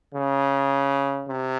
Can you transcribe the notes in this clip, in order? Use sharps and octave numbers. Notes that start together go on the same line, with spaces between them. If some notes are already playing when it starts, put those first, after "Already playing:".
C#3
C3